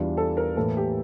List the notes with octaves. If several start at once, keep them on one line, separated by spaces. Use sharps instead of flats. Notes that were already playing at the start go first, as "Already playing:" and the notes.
Already playing: E2 E3 G3 D4 F4
A4
A#4
A2 E3 A#3 A4
G4